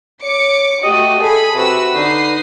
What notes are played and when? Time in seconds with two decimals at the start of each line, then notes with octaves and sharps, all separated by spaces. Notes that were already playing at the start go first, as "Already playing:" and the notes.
0.23 C#5 D6 C#7
0.83 A3 F#4 G4 D#5
1.22 G#4 A4 G#5 B5
1.55 C3 F#4 B4 E6
1.94 D3 D#4 D#6 C7